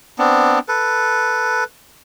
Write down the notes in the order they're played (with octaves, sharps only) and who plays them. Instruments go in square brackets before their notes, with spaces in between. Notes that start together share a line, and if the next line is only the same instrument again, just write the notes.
[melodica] B3 C4 D4
A4 B4